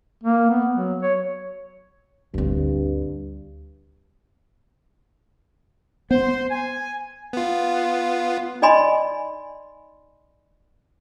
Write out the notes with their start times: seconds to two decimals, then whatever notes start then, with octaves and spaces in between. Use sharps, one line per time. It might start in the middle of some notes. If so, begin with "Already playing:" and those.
0.24 A#3
0.50 B3
0.75 F#3
1.03 C#5
2.34 D2 G2 C4
6.11 B3 C5
6.50 G#5
7.33 B3 F4
8.62 D#4 D5 D#5 G#5 B5 C6